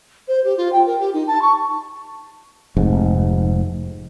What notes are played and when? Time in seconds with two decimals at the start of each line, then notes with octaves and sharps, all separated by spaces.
0.27 C5
0.43 G4
0.56 F4
0.72 G5
0.86 A#4
0.99 G4
1.13 D#4
1.26 A5
1.41 C#6
2.77 F1 G#2